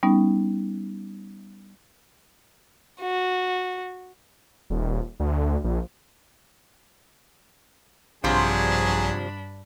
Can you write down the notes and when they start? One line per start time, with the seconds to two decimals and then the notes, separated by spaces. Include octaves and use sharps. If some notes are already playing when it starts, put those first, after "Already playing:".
0.03 G3 B3 C#4 D#4
3.01 F#4
4.70 D#1
5.20 D2
5.64 A#1
8.24 A#1 G2 C3 F3 F#3 D4 G#4 B5